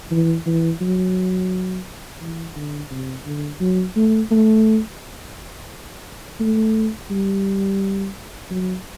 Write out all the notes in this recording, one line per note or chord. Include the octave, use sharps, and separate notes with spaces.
E3
E3
F#3
E3
D3
C3
D3
F#3
A3
A3
A3
G3
F#3